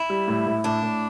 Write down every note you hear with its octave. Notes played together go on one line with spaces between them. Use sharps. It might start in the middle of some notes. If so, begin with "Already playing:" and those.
Already playing: E4
G3
A2
A2
A2 D4
A2